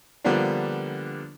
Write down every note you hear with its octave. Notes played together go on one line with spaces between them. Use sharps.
D3 F3 G3 A#3 B3 D4